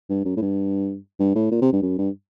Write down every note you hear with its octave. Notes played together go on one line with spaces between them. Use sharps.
G2
F#2
A2
G2
G2
A2
A#2
C3
G2
F#2
G2